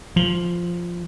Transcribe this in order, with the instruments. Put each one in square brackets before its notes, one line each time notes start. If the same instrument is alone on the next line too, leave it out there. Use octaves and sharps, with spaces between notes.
[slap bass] F3